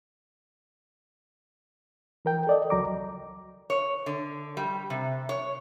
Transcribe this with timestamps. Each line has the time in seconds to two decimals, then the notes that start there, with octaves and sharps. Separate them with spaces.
2.25 E3 A#4 G5
2.47 A4 D5 D#5
2.70 C#2 F#3 A#5 D6
3.70 C#5
4.06 D3
4.57 G3
4.90 C3
5.29 C#5